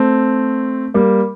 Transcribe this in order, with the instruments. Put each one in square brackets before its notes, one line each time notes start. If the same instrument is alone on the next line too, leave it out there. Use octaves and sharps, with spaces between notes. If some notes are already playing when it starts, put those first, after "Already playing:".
Already playing: [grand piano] A3 C4
G3 A#3